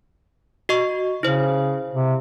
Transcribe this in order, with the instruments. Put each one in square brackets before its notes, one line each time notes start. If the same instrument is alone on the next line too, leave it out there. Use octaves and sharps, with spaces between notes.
[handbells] F#4 D#5 C#6
[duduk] C#3 [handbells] E4 C5
[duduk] C3